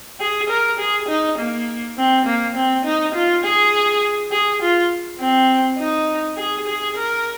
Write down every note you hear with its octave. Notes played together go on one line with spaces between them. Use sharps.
G#4
A#4
G#4
D#4
A#3
C4
A#3
C4
D#4
F4
G#4
G#4
F4
C4
D#4
G#4
G#4
A#4